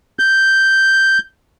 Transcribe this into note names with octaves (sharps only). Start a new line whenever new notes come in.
G6